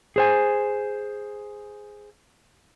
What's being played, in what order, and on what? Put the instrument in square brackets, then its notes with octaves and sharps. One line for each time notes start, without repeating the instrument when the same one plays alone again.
[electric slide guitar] G#4 C5 G#5